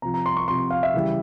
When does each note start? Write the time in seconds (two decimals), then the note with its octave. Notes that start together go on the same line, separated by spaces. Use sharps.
0.02 C3 F3 A#5
0.14 A#5
0.26 C6
0.37 C#6
0.48 C3 F3 C6
0.71 F5
0.83 E5
0.94 C#3 E3 G3